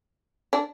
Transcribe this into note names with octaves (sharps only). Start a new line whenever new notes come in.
D4